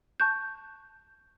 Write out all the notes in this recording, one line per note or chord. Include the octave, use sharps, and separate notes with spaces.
A5 C#6 F#6 G6